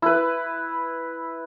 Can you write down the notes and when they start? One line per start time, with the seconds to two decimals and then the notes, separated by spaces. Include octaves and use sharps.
0.02 E4 B4